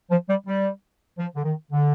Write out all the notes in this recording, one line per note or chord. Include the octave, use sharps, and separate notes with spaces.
F3
G3
G3
F3
D3
D#3
D3